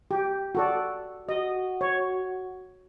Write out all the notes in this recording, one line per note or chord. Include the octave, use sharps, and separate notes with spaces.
G4
F#4 A4 D5
F#4 D#5
C#5